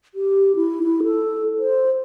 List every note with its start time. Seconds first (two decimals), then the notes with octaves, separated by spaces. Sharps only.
0.15 G4
0.56 E4
0.83 E4
1.04 A4
1.59 C5